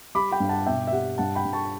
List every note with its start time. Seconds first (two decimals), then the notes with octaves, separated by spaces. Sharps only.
0.15 G3 B5 D6
0.32 G5 B5
0.40 G2
0.49 F#5 A5
0.66 B2 E5 G5
0.87 E5
0.92 G3 F#5
1.18 G2 F#5 A5
1.35 G5 B5
1.45 G2
1.53 A5 C#6